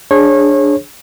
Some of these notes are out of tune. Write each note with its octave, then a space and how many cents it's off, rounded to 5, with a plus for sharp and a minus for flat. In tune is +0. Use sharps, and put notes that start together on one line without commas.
D4 +0 G#4 +0 C#5 -30